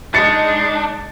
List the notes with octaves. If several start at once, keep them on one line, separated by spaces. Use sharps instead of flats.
G#3 D4 D#4 A6 C#7